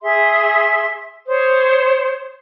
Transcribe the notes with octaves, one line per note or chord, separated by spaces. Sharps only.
G#4 E5 C6
C5 C#5 D#6